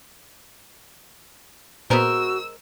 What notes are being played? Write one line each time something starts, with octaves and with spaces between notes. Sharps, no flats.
A#2 G#3 B3 F#4 A#4 C5 E6